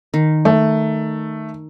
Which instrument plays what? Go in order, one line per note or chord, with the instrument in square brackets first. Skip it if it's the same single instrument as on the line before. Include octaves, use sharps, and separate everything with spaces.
[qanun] D#3
[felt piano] A3